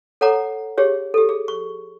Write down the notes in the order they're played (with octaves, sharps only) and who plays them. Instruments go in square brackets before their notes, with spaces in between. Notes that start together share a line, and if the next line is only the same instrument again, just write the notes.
[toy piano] A4 C#5 F#5 A#5 D6
G4 G#4 C#5
G4 A4
G#4
C#6